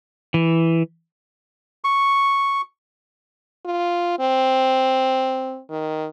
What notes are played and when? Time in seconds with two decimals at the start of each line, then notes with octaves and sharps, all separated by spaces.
0.34 E3
1.84 C#6
3.65 F4
4.19 C4
5.70 D#3